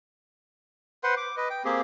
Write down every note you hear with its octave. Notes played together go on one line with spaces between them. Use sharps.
B4 C5 F#5 C6
D6
B4 D#5
G5
A#3 C4 G4 G#4